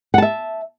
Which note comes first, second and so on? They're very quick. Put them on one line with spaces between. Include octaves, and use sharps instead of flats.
F#5 A5 E5